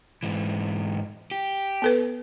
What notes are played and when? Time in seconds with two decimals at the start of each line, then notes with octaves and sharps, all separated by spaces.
0.23 G#2 E3
1.31 G4
1.82 B3 A4 B4